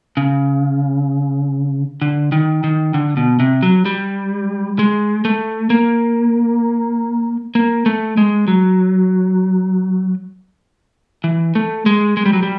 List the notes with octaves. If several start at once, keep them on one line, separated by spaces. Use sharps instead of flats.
C#3
D3
D#3
D#3
D3
B2
C3
F#3
G3
G#3
A3
A#3
A#3
A3
G#3
F#3
E3
A3
G#3
G#3
G3
F#3
G3